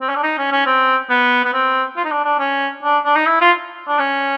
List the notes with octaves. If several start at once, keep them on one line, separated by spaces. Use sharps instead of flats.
C4
C#4
D4
D#4
C#4
C#4
C4
B3
B3
C4
F4
D#4
D4
D4
C#4
D4
D4
D#4
E4
F4
D4
C#4